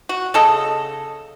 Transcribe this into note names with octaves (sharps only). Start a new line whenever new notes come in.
F#4
C#3 A4 D#5